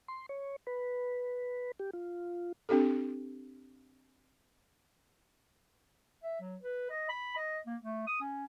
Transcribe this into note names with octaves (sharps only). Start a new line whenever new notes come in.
C6
C#5
B4
G4
F4
C4 D4 G4 A4
E5
F#3
B4
D#5
B5
D#5
A#3
A3
D#6
C#4